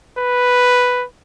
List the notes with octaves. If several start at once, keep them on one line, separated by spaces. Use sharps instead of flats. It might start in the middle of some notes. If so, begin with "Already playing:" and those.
B4